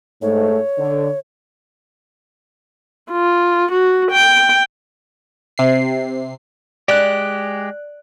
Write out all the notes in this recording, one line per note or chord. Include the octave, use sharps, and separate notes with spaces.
G#2 A3 C#5
D3
F4
F#4
G5
C3 C7
G#3 G4 D5 F#6